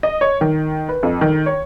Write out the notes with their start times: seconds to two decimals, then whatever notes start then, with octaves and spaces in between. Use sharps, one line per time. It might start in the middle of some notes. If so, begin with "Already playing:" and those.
0.03 D#5
0.21 C#5
0.41 D#3
0.89 B4
1.03 F2
1.21 D#3
1.46 C#5